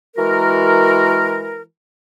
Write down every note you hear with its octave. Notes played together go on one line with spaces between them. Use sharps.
E3 G#3 F#4 A#4